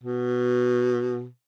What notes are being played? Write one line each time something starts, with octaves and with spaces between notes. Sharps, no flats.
B2